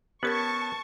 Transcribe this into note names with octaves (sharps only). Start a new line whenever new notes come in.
B3 C#4 G4 A#4 A5 C#6 A6